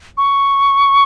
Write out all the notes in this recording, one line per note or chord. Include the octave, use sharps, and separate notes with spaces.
C#6